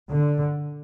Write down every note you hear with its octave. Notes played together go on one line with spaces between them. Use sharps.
D3